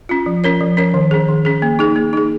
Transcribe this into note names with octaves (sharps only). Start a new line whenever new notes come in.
C#4 F4
F3
C#4 A#4 C#5
F3
C#4 A#4 C#5
D#3
C#4 G#4
D#3
C#4 G#4
A#3
D#4 G#4
A#3
D#4 G#4